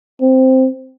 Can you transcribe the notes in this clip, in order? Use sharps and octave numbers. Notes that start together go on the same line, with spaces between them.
C4